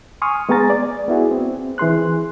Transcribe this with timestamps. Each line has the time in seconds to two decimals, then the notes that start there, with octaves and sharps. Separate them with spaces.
0.22 G#5 C6 C#6 D#6 F6
0.49 G#3 B3 G#4 G#5 A#5 A6
0.70 D5
1.08 B3 E4 F#4 G#4
1.31 C4
1.78 E3 G#4 C6 F#6